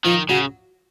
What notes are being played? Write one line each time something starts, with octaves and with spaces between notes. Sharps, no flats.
D#3 F3
C#3 F#3